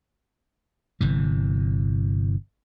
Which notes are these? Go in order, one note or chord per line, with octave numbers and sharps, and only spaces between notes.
G1 C3 E3